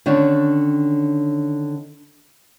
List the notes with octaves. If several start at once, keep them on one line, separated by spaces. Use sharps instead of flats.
D3 D#3 C#4 D4